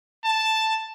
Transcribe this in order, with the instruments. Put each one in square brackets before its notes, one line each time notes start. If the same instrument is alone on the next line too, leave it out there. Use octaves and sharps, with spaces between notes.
[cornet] A5